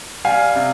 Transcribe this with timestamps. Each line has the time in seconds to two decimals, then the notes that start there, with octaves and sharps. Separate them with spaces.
0.25 G3 F5 G#5
0.55 C3